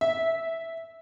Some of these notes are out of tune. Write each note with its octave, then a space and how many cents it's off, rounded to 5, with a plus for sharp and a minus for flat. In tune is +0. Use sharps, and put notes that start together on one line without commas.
E5 -10